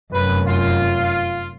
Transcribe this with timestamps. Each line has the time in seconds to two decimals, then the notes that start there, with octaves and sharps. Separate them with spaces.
0.13 F1 F#2 B4
0.48 F4